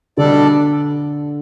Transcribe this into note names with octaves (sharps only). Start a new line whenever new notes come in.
B2 D3 G3 D4 A4 D5